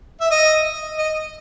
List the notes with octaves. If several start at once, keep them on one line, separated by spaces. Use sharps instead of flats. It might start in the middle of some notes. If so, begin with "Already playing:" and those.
E5
D#5
D#5